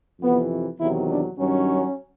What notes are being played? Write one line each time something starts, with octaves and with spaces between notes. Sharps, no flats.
F2 C3 E3 B3
E2 C3 D#3 F#3 E4
D4
G2 D#3 F#3 C#4